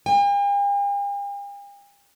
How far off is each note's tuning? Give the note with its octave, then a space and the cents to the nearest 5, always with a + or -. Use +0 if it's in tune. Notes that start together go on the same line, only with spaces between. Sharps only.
G5 +45